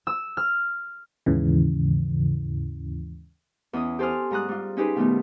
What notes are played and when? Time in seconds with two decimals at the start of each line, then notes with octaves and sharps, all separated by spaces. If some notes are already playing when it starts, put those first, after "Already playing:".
0.07 E6
0.37 F6
1.26 D#2 G#2 C#3 E3
3.73 E2 C#4 D#5 D#6
3.99 G4 A4 C5 G#5 D#6 F6
4.31 G#2 G3 A#5 D#6 F#6
4.48 G3 F4
4.77 C#4 D#4 G4 G#4 B4 C5
4.96 B2 D#3 G3 A3 B3